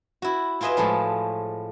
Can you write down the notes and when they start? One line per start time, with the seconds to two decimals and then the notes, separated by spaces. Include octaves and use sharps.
0.22 E4 F#4
0.61 E4 F4 G#4 B4 D#5 E5
0.77 A2 F3 G#3 A3